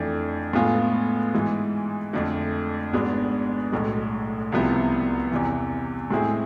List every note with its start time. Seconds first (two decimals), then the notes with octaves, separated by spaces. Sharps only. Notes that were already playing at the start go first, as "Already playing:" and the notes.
Already playing: F2 E3 A3 D4
0.53 A2 G#3 B3 F4 G#4
1.34 G#2 E3 G#3
2.13 F2 D3 A3
2.92 G#1 G#2 G#3 B3 D4
3.72 B1 A2 G#3
4.52 C2 C3 F3 B3 E4
5.31 E2 C3 E3
6.11 A2 G#3 C4 E4 G#4